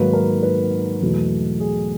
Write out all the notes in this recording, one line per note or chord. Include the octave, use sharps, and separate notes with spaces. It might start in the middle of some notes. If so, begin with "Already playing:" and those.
Already playing: G#2 D#3 F#3 A#3 B4
A#4
B4
E2 B2 F#3 A3
G#4